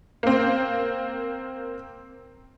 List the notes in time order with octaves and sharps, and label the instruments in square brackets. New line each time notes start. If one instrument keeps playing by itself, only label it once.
[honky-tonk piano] A#3 C4